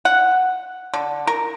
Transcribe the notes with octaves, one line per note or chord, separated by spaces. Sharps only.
F#5
D3
A#4